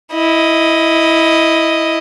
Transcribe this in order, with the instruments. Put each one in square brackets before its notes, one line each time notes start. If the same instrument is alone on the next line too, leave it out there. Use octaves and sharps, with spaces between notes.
[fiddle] E4 D#5